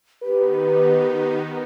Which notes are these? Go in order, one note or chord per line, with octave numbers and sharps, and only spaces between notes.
D#3 B3 D#4 G4 B4